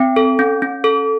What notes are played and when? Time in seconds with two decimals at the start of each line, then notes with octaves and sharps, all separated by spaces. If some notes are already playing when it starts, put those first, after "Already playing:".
Already playing: C4 G5
0.16 A4
0.39 C#4
0.62 C#4
0.84 A4